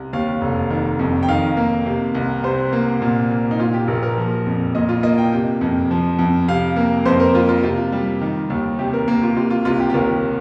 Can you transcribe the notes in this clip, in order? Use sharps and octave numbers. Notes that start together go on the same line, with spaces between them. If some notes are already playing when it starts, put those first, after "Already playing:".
Already playing: C2
D#2 F5
F1
D#3
F2
G5
D#3 F5
A#3
C3
C2
C3 C5
A#3
A#2
A#3
D#4
A#2 F4
G4
A#1 A#4
A#4
F3
F2
A#2 D#5
F4
A#3 D#5
G5
C3 G5
F2
F3
F2
C3 F5
A#3
F2 C5
A#4
A#3 F4
F4
C3 F4
G3
D#3
D#2
C3 G4
A#4
A#3
F4
C3 F4
F4
C2 F4
G4
G4
D#2 A#4